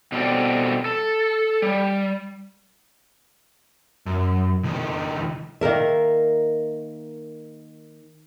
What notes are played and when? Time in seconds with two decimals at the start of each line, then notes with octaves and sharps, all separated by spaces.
0.12 B2 G3 C4 A4 D5
0.85 A4
1.62 G3
4.06 F#2
4.63 C#2 D#3
5.61 D#3 A#3 A#4 E5